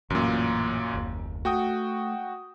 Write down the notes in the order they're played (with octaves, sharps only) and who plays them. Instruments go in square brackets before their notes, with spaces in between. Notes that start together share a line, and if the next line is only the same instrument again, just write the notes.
[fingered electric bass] A1 E3 [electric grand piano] F#2 A#2
[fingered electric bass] F#1 D#2
[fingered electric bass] A3 [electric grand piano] F#4 G5 D#6